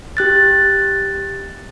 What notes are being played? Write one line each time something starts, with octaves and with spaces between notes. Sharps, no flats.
G4 F#6 A6